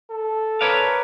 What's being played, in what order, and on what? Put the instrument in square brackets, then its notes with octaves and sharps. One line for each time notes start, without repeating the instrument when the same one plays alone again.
[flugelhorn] A4
[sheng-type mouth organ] A#4 B4 [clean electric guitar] C#5 D5 F5